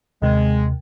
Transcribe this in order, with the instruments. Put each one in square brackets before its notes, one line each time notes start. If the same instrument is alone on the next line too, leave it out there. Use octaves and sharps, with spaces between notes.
[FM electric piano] D#2 C3 [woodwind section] G#3